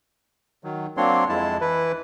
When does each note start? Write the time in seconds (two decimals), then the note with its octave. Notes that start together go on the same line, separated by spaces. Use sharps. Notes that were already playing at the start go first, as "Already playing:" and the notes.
0.64 D#3 F#3
0.97 F#3 A#3 C4 D4 C#5 C6
1.29 F2 G#3 E4 A5
1.61 E3 E4 B4